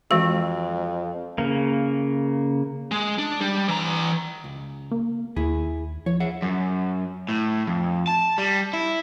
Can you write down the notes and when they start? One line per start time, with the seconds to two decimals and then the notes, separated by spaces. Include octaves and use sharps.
0.11 F2 E3 G#3 F#4
1.38 C#3 A#3
2.91 G#3
3.18 D4
3.41 G3
3.68 E3 A#5
4.44 C#2
4.91 A#3
5.36 D#2 E4 G#4
6.06 F3 C#5
6.20 G#4 E5 F#5
6.42 F#2
7.29 A2
7.67 F2
8.08 A5
8.38 G3
8.73 E4